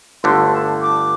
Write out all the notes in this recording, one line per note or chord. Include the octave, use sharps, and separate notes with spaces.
G1 G2 D3 A3 C6
A5
D6